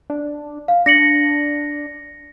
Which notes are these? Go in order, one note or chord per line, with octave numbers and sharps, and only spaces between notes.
D4
F5
D4 A#6 C#7 F#7